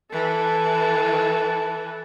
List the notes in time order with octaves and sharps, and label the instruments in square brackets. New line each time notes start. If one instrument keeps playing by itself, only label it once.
[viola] E3 [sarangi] A4